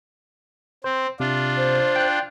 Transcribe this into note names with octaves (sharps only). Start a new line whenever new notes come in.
C4 C5
C3 D4 F4
C5
G5 F#6